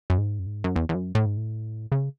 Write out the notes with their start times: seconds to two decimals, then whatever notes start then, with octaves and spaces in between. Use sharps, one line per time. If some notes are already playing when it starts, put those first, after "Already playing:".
0.10 F#2
0.18 G#2
0.39 F#2
0.47 G#2
0.64 F#2
0.76 E2
0.89 E2
0.95 F#2
1.15 A2
1.26 G#2
1.37 A2
1.92 C#3